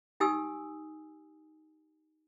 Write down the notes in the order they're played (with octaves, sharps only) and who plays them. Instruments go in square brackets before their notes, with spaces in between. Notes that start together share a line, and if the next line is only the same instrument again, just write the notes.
[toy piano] D#4 G4 G#5 D#6 E6